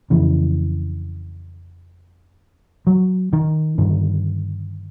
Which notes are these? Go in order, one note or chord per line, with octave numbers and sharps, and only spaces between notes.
F2 C#3 E3
F#3
D#3
G2 D3 D#3